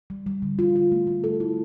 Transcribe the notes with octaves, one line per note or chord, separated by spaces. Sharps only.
G3
G3
D3
F4
F4
A3
A3
A4
E4